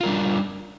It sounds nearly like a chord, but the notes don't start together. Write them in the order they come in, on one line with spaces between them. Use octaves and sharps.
F4 A#4 G3 D4